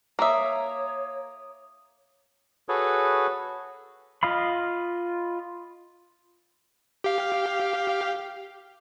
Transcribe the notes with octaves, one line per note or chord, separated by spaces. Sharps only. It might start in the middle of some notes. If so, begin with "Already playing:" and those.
A#3 C#5 E5 A#5 D6 D#6
F#4 G#4 A4 B4 C#5
F4 D#5 F5 B5
G4 F5